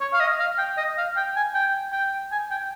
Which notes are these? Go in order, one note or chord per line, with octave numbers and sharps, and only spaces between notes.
C#5
F5
D#5
F5
G5
D#5
F5
G5
G#5
G5
G5
G#5
G5